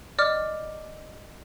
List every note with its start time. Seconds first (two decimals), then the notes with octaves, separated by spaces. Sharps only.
0.19 D5 D#5 D6 F6